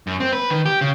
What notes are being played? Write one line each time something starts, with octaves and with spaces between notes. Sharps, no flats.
F#2
C4
B4
D#3
G4
C#3